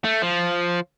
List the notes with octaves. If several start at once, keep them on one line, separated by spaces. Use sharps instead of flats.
A3
F3